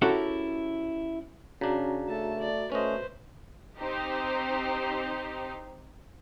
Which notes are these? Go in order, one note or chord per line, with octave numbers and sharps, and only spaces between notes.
C#4 E4 F#4 G4 A4 A#4
C#3 C#4 D4 F#4 A#5
A3 A4 A5
D5
A3 C#4 B4 C5 D#5
C4 D#4 G4 C5